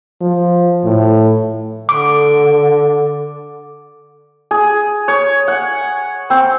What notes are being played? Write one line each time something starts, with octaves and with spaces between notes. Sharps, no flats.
F3
A2
D3 D6
G#4
C#5
F#5
C4